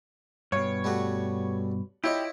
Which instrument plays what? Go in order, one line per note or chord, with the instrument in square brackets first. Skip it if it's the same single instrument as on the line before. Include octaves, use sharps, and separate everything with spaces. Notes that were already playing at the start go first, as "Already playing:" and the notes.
[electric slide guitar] G2 B2 [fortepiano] C#5
[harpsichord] G3 A3 F#4
[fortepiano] E4 [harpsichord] F4 C#5 D#5 [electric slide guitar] G4